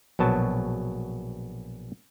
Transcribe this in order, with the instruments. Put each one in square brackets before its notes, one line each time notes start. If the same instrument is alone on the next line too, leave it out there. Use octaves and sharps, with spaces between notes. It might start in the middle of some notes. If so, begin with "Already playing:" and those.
[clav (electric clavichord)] A#1 B2 F#3 A5